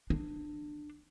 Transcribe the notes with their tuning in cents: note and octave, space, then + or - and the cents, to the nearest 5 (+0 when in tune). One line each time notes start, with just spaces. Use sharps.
D4 +20